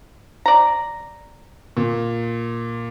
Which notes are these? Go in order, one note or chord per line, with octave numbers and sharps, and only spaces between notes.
D5 A#5
A#2